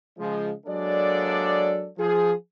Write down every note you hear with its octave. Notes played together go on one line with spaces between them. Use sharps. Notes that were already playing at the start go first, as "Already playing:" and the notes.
C#3 F3 G#3
F#3 G#3 A#3 D4 A4 D5
F3 G#4